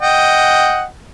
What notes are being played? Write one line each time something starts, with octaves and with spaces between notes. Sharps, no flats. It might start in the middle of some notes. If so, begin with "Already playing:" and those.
D#5 F#5 G5